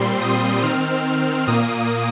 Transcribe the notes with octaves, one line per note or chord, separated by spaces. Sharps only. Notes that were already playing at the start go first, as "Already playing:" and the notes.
Already playing: A#2 G3 C4 C6
D#6
D#3 C4 F6
A#2 A#3 D#6